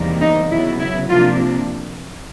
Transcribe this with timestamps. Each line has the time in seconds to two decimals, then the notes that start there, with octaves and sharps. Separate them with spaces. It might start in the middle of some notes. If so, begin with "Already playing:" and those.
Already playing: E2 C3 D#3 G3 A#3
0.21 D#4
0.50 C#3 F#3 B3 E4
0.80 E4
1.09 C3 F3 A#3 D4 F4